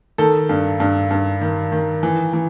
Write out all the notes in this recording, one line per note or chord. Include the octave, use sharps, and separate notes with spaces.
D#3 A4
G2
G2
G2
D#3
D#3
E3
E3